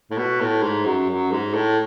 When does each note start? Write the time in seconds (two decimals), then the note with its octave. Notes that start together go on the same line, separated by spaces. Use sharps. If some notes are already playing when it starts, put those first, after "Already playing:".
0.11 A2
0.18 B2
0.41 A2
0.62 G#2
0.85 F#2
1.09 F#2
1.31 G#2
1.54 A2